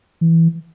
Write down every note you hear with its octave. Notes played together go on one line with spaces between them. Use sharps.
E3